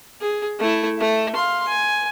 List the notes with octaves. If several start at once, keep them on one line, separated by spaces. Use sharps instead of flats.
G#4
A3 E4
A3 E5
F5 C6
G#5